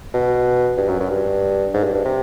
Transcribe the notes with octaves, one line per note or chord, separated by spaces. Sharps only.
B2
G2
F#2
F#2
G2
G#2
G2
G2
C3